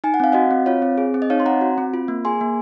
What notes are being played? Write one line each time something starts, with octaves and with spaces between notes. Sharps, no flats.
D#4 G#5
F#5
C4 F5
F#4 D#5 F#5
C4
F4 C#5 F5
C4
G#4
C4
D#5
D#4 C#5 F5
C6
C4 F#5 A#5
F#4
C4
F4
A#3
G#4 G#5 C6
A#3